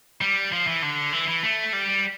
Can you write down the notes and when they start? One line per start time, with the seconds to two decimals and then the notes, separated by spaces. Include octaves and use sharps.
0.21 G3
0.52 F3
0.67 E3
0.82 D3
1.13 E3
1.28 E3
1.43 A3
1.73 G3